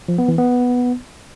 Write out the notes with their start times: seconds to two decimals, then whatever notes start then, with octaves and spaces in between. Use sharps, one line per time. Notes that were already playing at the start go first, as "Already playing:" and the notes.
0.08 F3
0.18 B3
0.28 E3
0.38 B3